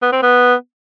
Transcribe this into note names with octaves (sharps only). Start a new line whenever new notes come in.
B3
C4
B3